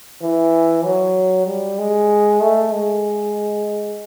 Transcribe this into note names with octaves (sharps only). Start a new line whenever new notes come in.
E3
F#3
G3
G#3
A3
G#3